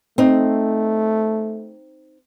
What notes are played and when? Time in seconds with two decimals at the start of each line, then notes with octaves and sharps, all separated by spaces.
0.18 A3 C4 D#4